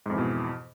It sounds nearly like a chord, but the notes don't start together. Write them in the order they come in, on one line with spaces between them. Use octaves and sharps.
G#2 F2 E3 B2